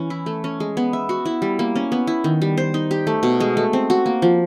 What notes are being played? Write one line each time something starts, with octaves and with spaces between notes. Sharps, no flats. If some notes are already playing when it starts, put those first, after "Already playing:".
Already playing: E3 C#4
E4
A3
C#4
G#3
B3
E5
F#4
E4
G3
A#3
C#4
B3
E4
D#3
G3
C5
D#4
G4
A3
B2
G#3
A3
C4
F#4
A#3
F3